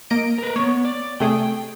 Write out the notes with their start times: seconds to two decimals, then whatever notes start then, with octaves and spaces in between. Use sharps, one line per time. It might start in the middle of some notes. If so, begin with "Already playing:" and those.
0.10 A#3 D#5 D7
0.38 A#4 B4
0.56 A#3 B3 C#5
0.85 D5
1.20 C3 A3 G#4 G5